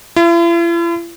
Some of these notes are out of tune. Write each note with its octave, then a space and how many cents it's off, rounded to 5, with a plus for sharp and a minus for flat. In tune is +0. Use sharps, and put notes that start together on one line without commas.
E4 +45